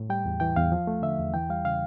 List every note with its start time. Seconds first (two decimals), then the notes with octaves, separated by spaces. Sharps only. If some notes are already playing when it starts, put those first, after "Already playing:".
Already playing: A2
0.10 G3 G5
0.25 E2
0.40 E3 G5
0.56 E2 F5
0.72 F3
0.87 A3
1.02 D3 E5
1.19 E2
1.34 E3 G5
1.50 G3 F5
1.65 C#3 F5